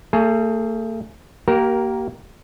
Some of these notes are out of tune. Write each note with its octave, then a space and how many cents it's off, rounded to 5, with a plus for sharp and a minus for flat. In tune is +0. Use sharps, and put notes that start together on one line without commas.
A3 +40 G#4 +15
A#3 +0 G4 -30 A#4 +10